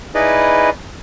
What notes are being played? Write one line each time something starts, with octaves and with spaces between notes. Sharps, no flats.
D#4 E4 G#4 B4 D5 D#5